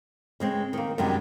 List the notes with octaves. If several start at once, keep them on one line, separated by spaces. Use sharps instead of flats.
C#3 G#3 C4
D#3 A#3
F#2 C3 D#3 G3 G#3